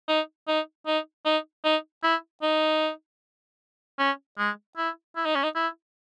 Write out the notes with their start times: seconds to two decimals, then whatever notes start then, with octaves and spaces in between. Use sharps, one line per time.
0.08 D#4
0.48 D#4
0.87 D#4
1.25 D#4
1.64 D#4
2.03 E4
2.42 D#4
3.99 C#4
4.38 G#3
4.77 E4
5.16 E4
5.25 D#4
5.35 C#4
5.43 D#4
5.55 E4